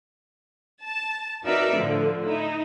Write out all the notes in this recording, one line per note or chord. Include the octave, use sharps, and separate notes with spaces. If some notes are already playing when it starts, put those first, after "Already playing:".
A5
D#4 F#4 A#4 B4 D5 E5
A2 D3 F3
D#4 E4